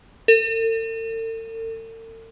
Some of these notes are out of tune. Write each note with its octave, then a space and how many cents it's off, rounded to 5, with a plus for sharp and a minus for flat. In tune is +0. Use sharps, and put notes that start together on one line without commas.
A4 +45